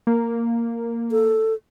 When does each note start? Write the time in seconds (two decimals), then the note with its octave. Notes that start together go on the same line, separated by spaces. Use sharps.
0.07 A#3
1.12 A4